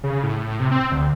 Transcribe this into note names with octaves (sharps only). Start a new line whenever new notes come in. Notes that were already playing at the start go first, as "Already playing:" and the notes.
C#3
A2
C3
C4
D2